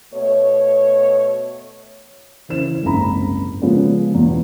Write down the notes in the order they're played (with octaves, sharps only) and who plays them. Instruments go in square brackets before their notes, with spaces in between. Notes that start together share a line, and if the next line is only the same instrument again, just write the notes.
[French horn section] B2 A3 C#5
[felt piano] C#3 E3 C5 E7
F#1 C2 G#2 D#4 A#5 B5
C#3 F3 G#3 B3 C#4
E2 B2